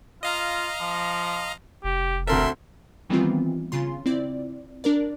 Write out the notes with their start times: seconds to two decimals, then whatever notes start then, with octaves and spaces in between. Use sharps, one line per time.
0.23 F4 D#5 F5 A#5
0.80 F3
1.84 F1 G4
2.27 D2 C4 A4 A#4 E5 C6
3.10 D#3 E3 G3 B3 C4 F4
3.72 C#3 F4 C6
4.06 C4 E4 D5
4.84 D4 A#4 D5